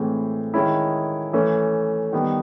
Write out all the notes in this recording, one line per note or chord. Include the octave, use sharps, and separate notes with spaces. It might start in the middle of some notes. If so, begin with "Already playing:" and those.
Already playing: A2 E3 G#3 C4
D#3 G#3 C#4 E4
E3 A3 C#4
D#3 G3 B3